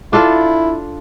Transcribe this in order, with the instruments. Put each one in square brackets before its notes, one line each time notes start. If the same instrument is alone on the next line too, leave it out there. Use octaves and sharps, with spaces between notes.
[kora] D4 F4 A4 [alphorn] E4